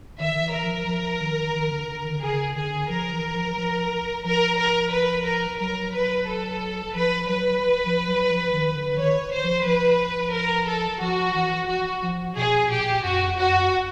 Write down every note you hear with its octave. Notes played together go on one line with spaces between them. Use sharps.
D#3 E5
D#3
E3
A#4
F3
F3
D#3
D#3
D3
D3
D#3
D3
C#3 G#4
D3 G#4
F3 A#4
E3
F3
F3
F3 A#4
A#4
B4
A#4
F#3 A#4
B4
A4
F3 B4
F#3 B4
F3
F#3
F3
D#3
D3
D#3 C#5
C5
F3
F3 B4
A#4
A4
F3 F#4
E3
F#4
F3
B2 G#4
A#2 G4
F#2 F#4
F2
F#4
F#2